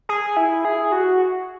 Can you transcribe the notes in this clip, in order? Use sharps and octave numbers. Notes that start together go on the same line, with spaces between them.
G#4
E4
G#4
F#4